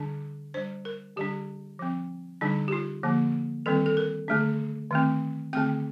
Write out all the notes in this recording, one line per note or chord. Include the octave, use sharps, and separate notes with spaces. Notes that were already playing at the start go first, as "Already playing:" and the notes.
Already playing: D3 G3 D4
G3 D4 C5
A#4
D3 G3 D4 G4
F3 C4
D3 G3 D4 D#4
G4
F4
D3 F3 A#3
D#3 G3 C4 A4
A4
A#4
D3 A3 D4
D#3 A3 C4
D3 A3 C4 G5